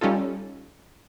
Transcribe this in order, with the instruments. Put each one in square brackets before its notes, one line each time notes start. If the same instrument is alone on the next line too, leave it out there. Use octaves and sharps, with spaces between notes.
[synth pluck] G3 C#4 D#4 F4 A4